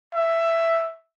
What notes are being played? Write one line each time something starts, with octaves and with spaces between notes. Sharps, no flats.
E5